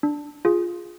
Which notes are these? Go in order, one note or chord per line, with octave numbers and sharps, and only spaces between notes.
D4
F4 G#4